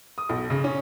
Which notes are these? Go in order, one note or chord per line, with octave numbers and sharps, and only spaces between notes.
D#6
B1
C#3
C#4